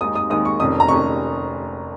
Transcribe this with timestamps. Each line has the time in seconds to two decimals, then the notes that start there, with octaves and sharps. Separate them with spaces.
0.01 D#2 D#3 G#3 D#4 D#6
0.15 D#6
0.30 D#2 D#3 G#3 D#4 D#6
0.45 C#6
0.60 F1 F2 D#3 C#4 D#6
0.80 A#5
0.89 F1 F2 D#3 C#4 C#6